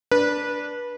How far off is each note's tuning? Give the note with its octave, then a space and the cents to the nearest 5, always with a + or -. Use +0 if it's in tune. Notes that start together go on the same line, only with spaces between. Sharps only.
D4 +0 B4 -20